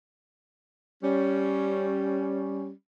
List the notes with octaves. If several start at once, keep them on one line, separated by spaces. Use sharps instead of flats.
G3 C#4